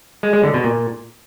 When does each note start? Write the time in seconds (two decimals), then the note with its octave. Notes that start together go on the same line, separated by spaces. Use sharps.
0.23 G#3
0.33 G#3
0.44 D3
0.54 B2
0.64 A#2